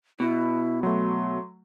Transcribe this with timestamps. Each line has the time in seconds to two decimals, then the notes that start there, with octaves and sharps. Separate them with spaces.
0.20 B2 E4
0.83 F#3 A3 C6